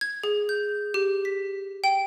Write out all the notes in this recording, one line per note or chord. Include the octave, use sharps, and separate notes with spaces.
G#6
G#4
G6
G4
B6
G5